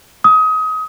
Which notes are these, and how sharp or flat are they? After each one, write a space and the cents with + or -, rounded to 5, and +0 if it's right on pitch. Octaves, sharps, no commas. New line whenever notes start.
D#6 +25